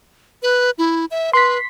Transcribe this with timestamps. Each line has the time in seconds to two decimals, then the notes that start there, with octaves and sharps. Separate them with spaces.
0.43 B4
0.78 E4
1.11 E5
1.33 B4 C6 B6